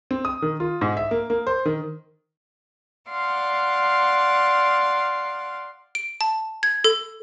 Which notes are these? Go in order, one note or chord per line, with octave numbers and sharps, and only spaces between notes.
C4
D#6
D#3
F4
G#2
E5
A#3
A#3
C5
D#3
D5 F5 F#5 C6
D7
A5
G#6
A4